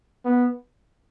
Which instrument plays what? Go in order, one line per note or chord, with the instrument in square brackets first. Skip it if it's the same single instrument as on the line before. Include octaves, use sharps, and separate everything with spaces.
[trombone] B3